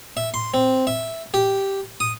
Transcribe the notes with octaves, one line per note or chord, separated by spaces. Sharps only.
E5
C6
C4
E5
G4
D#6